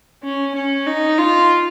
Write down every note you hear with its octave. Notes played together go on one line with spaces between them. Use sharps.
C#4
C#4
D#4
F4